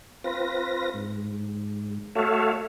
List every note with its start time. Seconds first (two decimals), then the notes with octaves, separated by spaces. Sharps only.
0.24 C4 F4 B4 A#6
0.94 G#2
2.15 A3 F#4 A4 C#5 E5 F5